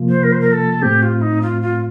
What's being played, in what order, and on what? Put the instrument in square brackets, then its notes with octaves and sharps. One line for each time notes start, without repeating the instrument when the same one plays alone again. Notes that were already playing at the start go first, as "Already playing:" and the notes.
Already playing: [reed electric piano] C3 F3 A#3 F4
[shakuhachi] C5
A#4
C5
A#4
A4
[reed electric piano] A2 A3 C4 [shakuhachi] G4
[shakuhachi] F4
D#4
F4
F4